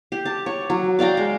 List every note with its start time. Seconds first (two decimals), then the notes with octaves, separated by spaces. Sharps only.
0.12 G4
0.26 A5
0.46 C#5
0.70 F#3
0.99 D5 F5 G5 A#5
1.17 G#3